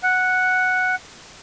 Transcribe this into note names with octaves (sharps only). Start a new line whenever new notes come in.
F#5